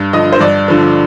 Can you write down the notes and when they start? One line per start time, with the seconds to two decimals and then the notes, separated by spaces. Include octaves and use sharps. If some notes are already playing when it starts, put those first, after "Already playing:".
Already playing: G2
0.13 D3 F3 D#5
0.32 C5
0.40 G2 D5
0.68 D3 F3